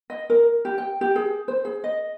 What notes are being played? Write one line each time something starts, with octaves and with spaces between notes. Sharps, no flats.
D#5
A#4
G4
G5
G4
G#4
C5
G#4
D#5